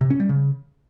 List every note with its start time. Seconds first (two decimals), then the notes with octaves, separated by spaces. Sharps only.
0.01 C3
0.10 C#4
0.20 G3
0.29 C#3